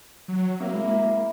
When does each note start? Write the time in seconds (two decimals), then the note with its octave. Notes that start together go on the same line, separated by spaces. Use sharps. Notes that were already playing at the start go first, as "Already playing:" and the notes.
0.28 F#3
0.60 A#3 C4 F#4 E5
0.74 G#3 E4